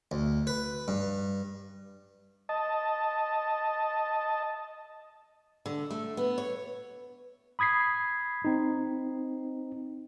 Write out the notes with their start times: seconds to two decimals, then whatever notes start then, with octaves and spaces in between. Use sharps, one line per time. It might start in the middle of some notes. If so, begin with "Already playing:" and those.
0.11 D2
0.47 B4
0.88 G2
2.49 D#5 A5
5.66 D3
5.91 A3
6.17 B3
6.38 C#5
7.59 B5 D#6 G#6 B6 C7
8.45 C4 D#4